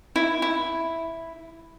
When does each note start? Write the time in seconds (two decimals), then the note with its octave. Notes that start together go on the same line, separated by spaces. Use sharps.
0.16 E4
0.42 E4